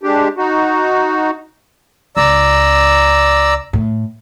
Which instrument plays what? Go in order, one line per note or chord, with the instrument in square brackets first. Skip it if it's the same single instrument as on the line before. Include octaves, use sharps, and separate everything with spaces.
[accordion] G#3 D4 G4
D#4 F#4
[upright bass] C#2 [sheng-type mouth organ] D5 A#5 E6
[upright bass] A2